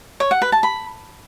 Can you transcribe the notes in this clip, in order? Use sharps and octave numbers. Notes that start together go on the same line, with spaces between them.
C#5
F#5
B4
A5
B5